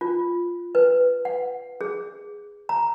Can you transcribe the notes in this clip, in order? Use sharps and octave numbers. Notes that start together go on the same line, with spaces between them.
F4
B4
F#5
G#4
A#5